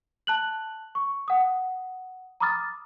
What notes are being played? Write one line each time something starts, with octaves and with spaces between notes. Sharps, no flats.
A5 F#6 F#7
C#6
F#5 D#6
A#5 B5 D6 D#6 F6 A6